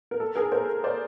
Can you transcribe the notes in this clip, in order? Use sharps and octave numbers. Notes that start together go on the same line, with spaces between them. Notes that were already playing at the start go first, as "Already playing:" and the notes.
A#4
A4
G#4 A#4
A#4 C5
C5 D5